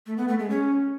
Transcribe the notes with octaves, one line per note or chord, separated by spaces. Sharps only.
A3
B3
A3
G#3
C#4